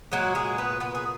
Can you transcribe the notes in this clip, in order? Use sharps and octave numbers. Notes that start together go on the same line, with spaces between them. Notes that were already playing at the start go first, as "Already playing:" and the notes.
A#2 F#3 G#3 F#4
G#3 G#4
B3 B4
B3 B4
G#4